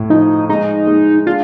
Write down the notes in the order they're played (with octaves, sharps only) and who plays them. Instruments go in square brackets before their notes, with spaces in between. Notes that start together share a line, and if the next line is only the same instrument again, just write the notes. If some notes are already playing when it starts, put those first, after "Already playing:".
Already playing: [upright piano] A2
[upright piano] F3 [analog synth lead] D#4
[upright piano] G#3 [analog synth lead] D#4
[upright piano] G#3
[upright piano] D4 [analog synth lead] F4